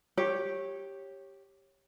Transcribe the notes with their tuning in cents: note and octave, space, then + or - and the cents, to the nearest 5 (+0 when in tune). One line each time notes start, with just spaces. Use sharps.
G4 +0 C#5 -15